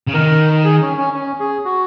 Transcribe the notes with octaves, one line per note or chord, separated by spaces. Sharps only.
C#3
D#3 A#4
G#4
C#4
C#4
C#4
G#4
F#4